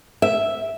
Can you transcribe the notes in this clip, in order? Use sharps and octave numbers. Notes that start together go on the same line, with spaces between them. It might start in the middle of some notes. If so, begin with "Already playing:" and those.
E5